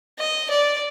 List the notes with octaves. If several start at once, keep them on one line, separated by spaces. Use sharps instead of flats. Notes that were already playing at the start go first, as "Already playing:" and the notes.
D#5
D5